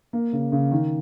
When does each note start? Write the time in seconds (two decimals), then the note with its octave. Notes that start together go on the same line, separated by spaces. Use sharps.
0.13 A#3
0.33 C#3
0.52 C#3
0.72 D#3